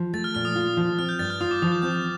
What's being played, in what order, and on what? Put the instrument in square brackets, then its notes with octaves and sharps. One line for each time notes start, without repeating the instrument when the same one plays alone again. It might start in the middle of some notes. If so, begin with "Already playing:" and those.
Already playing: [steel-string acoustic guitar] F3
[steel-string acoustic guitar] A3 [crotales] A6
[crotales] F6
[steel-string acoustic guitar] A#2 [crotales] F6
[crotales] D#6
[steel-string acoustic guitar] F4
F3
[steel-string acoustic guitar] C4 [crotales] F6
[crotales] G6
[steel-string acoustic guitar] G2 [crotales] A6
[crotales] F6
[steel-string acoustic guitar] F4 [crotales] D#6
[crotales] D6
[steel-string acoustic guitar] F3 [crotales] D#6
[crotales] G6
[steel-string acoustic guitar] C4 [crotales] G6